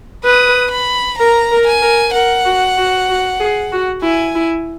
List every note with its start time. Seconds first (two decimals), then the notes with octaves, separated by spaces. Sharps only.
0.25 B4 D#6
0.71 B5
1.19 A#4 A#5
1.51 A#4
1.67 G#5
1.82 A#4
2.14 A#4 F#5
2.45 F#4
2.77 F#4
3.09 F#4
3.40 G#4
3.72 F#4
4.03 E4 G#5
4.35 E4